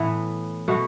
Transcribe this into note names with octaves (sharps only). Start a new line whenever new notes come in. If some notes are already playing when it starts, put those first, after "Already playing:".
Already playing: A2 E3 B3
B2 A3 F#4